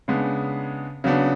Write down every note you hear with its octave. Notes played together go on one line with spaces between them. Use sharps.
C#3 G#3 B3 D4
C#3 F#3 B3 D4